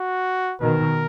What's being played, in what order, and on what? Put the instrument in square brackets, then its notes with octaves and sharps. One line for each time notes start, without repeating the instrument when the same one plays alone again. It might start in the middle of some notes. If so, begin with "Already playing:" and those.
Already playing: [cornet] F#4
[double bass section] B2 D#3 [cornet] A#4